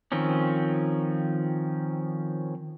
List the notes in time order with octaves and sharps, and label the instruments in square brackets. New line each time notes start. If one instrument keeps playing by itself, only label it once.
[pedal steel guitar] D#3 F3 C4 C#4